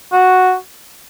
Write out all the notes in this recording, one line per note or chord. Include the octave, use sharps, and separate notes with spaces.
F#4